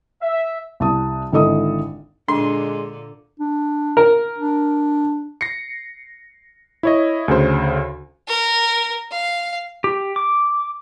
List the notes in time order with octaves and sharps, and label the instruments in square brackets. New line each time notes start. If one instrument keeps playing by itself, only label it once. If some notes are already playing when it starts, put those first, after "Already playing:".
[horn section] E5
[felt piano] C2 A5 D#6
G#1 D3 E4 A4 D#5 D#6
[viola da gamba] A#2 D3 [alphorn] G#3 [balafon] D4 [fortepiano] C6
[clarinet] D4
[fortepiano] A#4
[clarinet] D4
[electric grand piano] A#6 C7 C#7
E4 C#5 D#5
D2 C#3 C5
[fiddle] A#4
F5
[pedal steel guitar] G4
D6